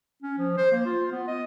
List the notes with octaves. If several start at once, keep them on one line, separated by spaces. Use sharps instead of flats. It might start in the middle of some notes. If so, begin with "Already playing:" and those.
C#4
F3
C5
A#3
F4
B3
D#5